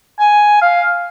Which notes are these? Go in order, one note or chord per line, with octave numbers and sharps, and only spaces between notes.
G#5
F5